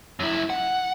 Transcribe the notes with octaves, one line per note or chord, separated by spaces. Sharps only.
F#2 E4
F#5